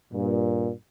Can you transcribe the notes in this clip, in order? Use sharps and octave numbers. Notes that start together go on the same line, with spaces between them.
G2 A#2